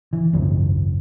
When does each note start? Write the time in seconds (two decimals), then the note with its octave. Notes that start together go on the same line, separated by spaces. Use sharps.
0.13 E3
0.33 G#1 C#2 F#2 F3